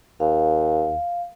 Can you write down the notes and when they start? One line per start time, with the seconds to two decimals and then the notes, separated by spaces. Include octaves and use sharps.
0.20 D#2 F5